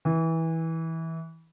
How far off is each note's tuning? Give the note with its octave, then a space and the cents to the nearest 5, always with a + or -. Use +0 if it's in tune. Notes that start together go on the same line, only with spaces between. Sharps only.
E3 -20